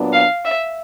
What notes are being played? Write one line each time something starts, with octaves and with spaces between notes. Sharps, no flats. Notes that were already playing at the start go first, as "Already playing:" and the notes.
Already playing: A#2 F#3 B3 D4
F5
E5